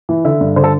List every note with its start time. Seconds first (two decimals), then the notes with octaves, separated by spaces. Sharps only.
0.09 E3
0.25 D3 E5
0.41 G2
0.56 D3 C5
0.64 A4